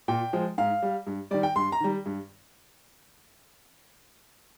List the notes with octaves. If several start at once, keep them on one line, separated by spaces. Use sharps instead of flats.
A#2 G5
F3 G#3
G#2 F5
G3
G2
D#3 G3 D5
G5
G2 C6
A#5
D#3 G3
G2